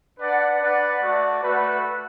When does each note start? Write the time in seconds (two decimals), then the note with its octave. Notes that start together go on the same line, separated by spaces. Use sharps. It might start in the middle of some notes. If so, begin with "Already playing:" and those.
0.19 D4 B4 D5 F#5
0.59 D4 B4 D5 F#5
1.00 A3 F#4 D5
1.41 A3 F#4 B4